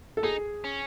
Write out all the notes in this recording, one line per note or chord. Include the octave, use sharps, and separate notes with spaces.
A4
D#4 G#4
C#4